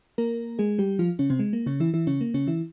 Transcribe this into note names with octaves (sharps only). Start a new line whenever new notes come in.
A#3 A#4
G#3 G#4
G3 G4
F3 F4
C#3 C#4
C3 C4
G#3
A#3
C#3 C#4
E3 E4
E3 E4
C#3 C#4
A#3
C#3 C#4
E3 E4